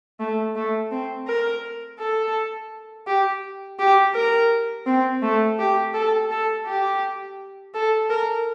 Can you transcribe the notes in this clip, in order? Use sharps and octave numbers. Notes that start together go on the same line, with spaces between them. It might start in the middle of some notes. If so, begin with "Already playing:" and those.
A3
A3
C4
A#4
A4
G4
G4
A#4
C4
A3
G4
A4
A4
G4
A4
A#4